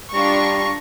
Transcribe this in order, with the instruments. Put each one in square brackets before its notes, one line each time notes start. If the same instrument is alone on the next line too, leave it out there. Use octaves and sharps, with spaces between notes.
[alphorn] G3 [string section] D4 F4 [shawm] A#5 [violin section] C#6